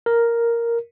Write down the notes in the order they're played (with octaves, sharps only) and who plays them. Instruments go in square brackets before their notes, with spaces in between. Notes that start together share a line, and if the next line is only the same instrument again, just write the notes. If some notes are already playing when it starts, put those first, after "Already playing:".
[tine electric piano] A#4